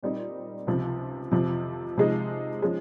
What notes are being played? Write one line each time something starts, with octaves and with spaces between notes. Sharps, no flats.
A#2 G3 C4 D#4
C#2 C3 F3
F2 C3 F3
C3 F3 G#3 D#4
F3 G#3 C#4